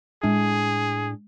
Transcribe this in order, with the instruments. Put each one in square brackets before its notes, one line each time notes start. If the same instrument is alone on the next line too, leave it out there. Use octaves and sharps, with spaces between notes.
[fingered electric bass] A2 D4 [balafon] G#3 [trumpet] G#4